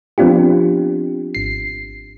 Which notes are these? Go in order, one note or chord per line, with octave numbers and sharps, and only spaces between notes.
F3 B3 C4 D4 F4 G4
G#1 C7